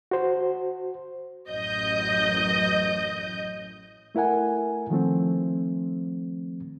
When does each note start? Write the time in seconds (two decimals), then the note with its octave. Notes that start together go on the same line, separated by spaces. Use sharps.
0.11 F#4 C5
1.49 A1 F#2 D#5 G6
4.15 A3 E4 A#4 F#5 G#5
4.90 D#3 F3 A3 C4